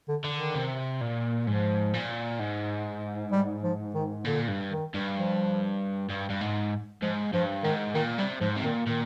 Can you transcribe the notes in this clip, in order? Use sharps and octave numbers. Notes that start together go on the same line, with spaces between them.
D3
D3
D#3
C3
A#2
G#2 F3
A#2
G#2
G3
F3
D#3
A#2 D3
G2
D#3
G2
F3
G2
G2
G#2
G#2 F3
G2 F3
G#2 D#3
A#2 D#3
C3 G3
G#2 F3
C3
A#2 D#3
A#2 D#3